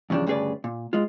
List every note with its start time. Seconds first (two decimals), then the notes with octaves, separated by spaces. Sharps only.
0.10 E2 G2 C#3 F3 D4
0.27 D2 G2 C#3 G#4 B4 D5
0.64 A#2
0.93 G#3 F4